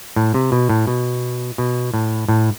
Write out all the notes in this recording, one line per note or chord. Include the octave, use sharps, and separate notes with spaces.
A2
C3
B2
A2
B2
B2
A2
A2